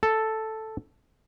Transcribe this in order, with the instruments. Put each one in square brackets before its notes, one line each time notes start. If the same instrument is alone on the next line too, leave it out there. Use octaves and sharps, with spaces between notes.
[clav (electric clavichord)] A4